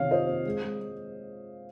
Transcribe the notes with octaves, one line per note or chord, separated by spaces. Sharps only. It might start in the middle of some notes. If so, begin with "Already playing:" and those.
Already playing: C3 D#3 C4 C#5 F5
F4 C5 D#5
C4
G#3
G#3
G#3